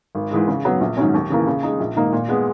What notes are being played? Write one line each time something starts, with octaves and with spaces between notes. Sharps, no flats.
G#1
G#2 E3 G#3
C#3
F#3 B3
A#1
G#2 D#3 F#3 C#4
D#2
C#3 E3 A#3
C#3
G#3 D#4
A#1
G#2 D#3 A#3 D#4
A#2
G#3 B3